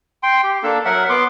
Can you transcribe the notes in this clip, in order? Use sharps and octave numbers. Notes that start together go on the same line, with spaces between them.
G5 C6
G4
A#3 D4 A4
F#3 A#4 E5 F#5
B3 C6 D6